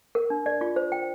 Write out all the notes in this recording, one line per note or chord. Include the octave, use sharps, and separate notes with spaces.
A#4
D4
D5
F4
C5
G5